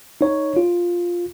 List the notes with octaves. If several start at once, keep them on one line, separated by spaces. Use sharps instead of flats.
D#4 C#5
F4